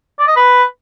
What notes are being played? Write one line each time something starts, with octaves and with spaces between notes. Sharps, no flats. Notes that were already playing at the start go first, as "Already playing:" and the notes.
D5
D#5
B4